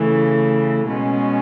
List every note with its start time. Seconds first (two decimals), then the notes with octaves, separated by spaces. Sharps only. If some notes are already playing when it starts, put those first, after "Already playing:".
Already playing: C#3 E3 A3
0.86 B2 G#3 C#4